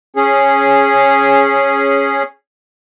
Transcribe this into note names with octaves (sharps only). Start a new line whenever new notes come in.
C#4 G#4